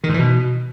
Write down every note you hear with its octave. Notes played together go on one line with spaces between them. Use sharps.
D#3
G#2
E3
B2